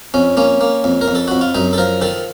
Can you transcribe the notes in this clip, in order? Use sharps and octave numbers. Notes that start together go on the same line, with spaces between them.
F2 C#4
A#3 C#4
A#3
F2
A#4
F2
A4
F2 F#4
F4
F#2 D#4
A4
F3 A#4
D#3 A4